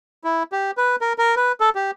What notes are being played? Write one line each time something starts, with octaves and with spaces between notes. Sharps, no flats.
E4
G4
B4
A#4
A#4
B4
A4
G4